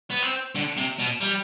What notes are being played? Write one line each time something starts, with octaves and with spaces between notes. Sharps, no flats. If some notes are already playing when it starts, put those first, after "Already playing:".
B3
C4
D3
C3
B2
G3